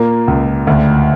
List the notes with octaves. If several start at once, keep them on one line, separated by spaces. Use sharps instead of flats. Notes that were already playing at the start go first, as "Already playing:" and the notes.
Already playing: A#2 A#3
C#2
D2